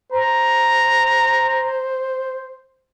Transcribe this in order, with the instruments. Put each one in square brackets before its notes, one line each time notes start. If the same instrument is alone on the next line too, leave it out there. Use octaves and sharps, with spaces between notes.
[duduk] C5 [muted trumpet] A#5